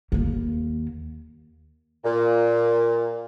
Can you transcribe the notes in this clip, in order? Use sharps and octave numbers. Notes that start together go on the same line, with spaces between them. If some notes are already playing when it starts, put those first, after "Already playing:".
D#2 A#3
A#2